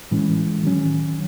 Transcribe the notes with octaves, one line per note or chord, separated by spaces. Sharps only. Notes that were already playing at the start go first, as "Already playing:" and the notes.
A2 E3 G#3 C#4
D#3 F#3 C#4